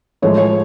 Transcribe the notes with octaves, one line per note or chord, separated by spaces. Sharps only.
A2 F3 G#3 C#5
C#5